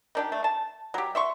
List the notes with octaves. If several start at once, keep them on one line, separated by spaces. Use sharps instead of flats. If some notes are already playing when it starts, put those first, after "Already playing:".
D#3 D4 G4
A3
A5
F#3 G4
E5 C6 C#6